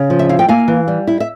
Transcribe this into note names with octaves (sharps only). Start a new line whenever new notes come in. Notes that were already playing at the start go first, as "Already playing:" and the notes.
Already playing: C#3
F3
E5
E4 F5
G5
A#3 F5 G#5
E3
G3
E4
E5